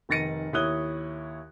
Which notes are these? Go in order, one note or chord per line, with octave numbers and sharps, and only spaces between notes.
F1 D#3 A6 A#6 C#7 D#7
D#2 E4 C#5 D#6 F#6 G7